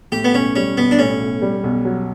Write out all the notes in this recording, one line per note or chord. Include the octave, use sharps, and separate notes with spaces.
A2 G4
B3
B1 C#4
G3 C#4
B1 B3
D4
A2 C#4
B1
G3
B1
F#3